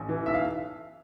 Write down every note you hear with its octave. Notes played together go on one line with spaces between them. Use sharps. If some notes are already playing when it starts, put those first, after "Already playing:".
Already playing: A1
E3
B1 E5
F5